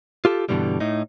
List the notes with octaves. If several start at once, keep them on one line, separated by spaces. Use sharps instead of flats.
F4 G4 A4
G2 B2 D3 E3 G3
A2 D#4